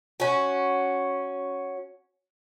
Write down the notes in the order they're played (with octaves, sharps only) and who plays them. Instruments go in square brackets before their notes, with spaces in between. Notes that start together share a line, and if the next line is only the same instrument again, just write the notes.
[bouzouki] C#4 F#4